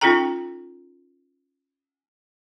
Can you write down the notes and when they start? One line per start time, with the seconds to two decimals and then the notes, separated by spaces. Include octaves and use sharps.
0.01 C#4 D#4 F4 A4 G5 A#5